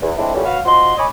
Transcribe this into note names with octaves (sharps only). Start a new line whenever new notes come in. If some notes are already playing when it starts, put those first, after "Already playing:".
E2
A2 F3 G#3 C4 D4 E4
A#2 E3 F#3 G3 A3 C#4
F#4 B4 C#5 F5
F3 F#4 D#5 C6
C#5 D#5 G#5 B5 D6